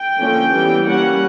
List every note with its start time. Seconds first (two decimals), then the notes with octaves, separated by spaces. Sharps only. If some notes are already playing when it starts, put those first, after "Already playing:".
Already playing: G5
0.19 D3 F3 A#3 C#4
0.52 E3 G3 B3
0.86 G3 A#3 C#4 F#5